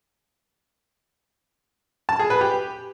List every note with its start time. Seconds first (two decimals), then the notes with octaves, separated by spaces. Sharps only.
2.09 A5
2.19 G#4
2.30 B4
2.41 G4